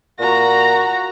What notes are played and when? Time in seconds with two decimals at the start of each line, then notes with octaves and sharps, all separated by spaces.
0.20 A#2 F#4 A#5 A#6